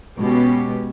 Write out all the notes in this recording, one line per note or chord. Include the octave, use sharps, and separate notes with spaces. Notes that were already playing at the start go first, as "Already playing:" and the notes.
B2 G#3 B3 C#4 G4